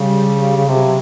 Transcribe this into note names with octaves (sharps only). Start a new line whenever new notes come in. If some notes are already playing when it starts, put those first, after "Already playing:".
Already playing: C#3 G3
C#3
C3 F#3